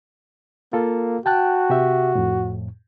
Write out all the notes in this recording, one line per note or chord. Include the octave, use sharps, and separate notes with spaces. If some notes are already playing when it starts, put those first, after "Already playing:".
A#3 F4 A4
F#4 G5 A5 F#6
C3 G4 E5
F2 A2